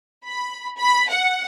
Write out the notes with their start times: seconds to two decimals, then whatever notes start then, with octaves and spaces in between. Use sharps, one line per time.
0.25 B5
0.77 B5
1.09 F#5